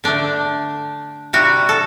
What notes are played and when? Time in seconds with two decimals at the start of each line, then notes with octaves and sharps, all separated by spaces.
0.04 D3 A3 D4
1.33 C3 G3 F#4
1.69 A4